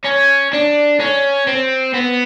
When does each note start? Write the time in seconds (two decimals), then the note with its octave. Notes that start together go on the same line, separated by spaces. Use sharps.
0.05 C#4
0.53 D4
1.00 C#4
1.48 C4
1.94 B3